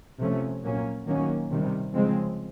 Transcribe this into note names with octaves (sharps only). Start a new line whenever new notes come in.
C3 F3 A3 C#4
A#2 F#3 A#3 C#4
D#3 F#3 A#3 C#4
C3 D#3 G3
C#3 F3 G#3 C4